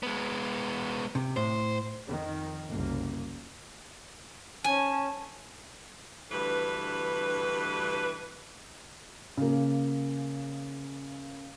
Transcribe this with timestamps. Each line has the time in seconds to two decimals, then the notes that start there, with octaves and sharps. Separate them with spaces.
0.03 G#3 B3
1.15 C3
1.37 A2 C5
2.07 F2 D#3
2.69 F#1 C2 A#3
4.64 C#4 G#5 A5
6.31 D2 G2 E3 B4
9.37 C#3 A#3